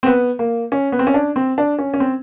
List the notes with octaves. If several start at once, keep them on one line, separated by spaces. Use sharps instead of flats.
C4
B3
A#3
C#4
B3
C4
C#4
D4
C4
D4
C#4
C#4
C4